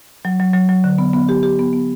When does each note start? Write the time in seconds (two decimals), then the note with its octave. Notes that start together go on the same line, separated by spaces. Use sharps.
0.25 F#3
0.40 F#3
0.53 F#3
0.69 F#3
0.84 D3
0.98 B3
1.13 B3
1.29 G4
1.43 G4
1.59 B3
1.73 B3